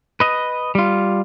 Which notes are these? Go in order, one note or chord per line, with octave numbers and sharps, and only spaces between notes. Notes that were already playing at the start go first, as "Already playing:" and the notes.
B4 D#5
G3 F4